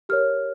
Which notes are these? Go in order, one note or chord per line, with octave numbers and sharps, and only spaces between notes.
G4 A#4 C#5 F6